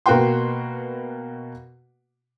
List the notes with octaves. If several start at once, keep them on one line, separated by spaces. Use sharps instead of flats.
B2 A#3 F#4 B4 G5 C6